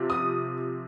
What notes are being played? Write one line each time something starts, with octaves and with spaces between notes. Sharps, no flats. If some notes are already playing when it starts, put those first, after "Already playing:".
Already playing: C3 F3
D#6